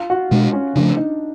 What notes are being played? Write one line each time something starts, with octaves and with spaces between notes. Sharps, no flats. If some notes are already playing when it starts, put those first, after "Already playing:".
Already playing: F4
F#4
B2 G#3 B3 D4
C#4
C#3 F3 A3 D4
D#4